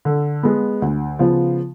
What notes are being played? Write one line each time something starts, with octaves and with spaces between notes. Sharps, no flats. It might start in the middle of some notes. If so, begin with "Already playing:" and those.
D3
G#3 B3
D2
C#3 F3 B3 F4